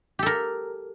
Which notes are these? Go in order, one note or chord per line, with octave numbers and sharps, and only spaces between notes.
G4 A4 A#4